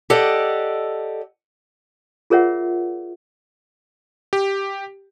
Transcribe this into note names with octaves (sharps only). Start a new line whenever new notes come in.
G4 A4 D5 D#5 F#5
F4 G#4 A#4 C#5 E5 F#5
G4